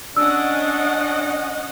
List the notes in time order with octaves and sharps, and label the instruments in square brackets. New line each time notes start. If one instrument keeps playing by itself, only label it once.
[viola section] C#4 D#5 F#5 [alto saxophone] D4 [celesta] E6